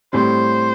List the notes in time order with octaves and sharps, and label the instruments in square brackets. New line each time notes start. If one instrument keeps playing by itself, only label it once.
[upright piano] A2 G3 C4 [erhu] C5